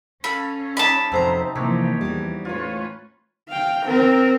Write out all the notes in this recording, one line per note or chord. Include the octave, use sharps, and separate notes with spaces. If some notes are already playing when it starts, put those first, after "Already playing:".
C#4 A4 F5 B5
G3 D#4 A5 B5
F2 C3 F#3 C4 C5 A#5
C3 E3 F3 A#3 G4 C#5
E2 E3 G3
A3 C#4 F4 B4 C#5
F5 G5
C4 A#4